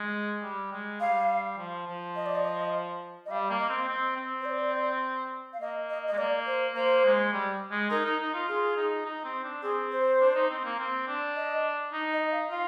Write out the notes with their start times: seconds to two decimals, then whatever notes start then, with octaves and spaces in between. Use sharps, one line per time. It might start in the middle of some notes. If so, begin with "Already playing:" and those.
Already playing: G#3
0.43 G3
0.72 G#3
1.00 G3 F5
1.57 F3
1.87 F3
2.16 D#5
2.26 D5
2.36 D#5
3.26 D#5
3.30 G3 F5
3.50 A#3
3.59 D#5
3.69 C4
3.87 C4
4.16 C4
4.41 C5
4.45 D5
5.53 F5
5.61 A#3 D#5
5.90 D#5
6.08 G#3 D#5
6.18 A#3 D5
6.47 C5
6.75 A#3 C5
7.04 G#3
7.33 G3
7.71 G#3
7.90 D#4 A#4
8.05 D#4
8.20 D#4
8.34 F4
8.48 F4 G#4
8.77 D#4
9.06 D#4
9.24 C4
9.44 D4
9.63 C4 G#4
9.92 C5
10.20 D4
10.35 D#4
10.50 C4
10.64 A#3
10.79 C4
11.08 D4
11.36 D#5
11.93 D#4
12.13 D#5
12.32 F5
12.51 F4 F5